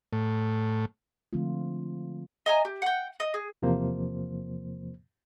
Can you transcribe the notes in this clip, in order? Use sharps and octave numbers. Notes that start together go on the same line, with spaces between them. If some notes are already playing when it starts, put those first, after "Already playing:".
A2
D3 F3 G#3 A3 C4 F4
D#5 G#5 A#5
G4
F#5 G5
D#5
G#4
E2 C3 F3 A#3 C5